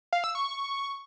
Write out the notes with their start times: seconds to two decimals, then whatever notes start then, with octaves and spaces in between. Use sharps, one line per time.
0.13 F5
0.24 E6
0.35 C#6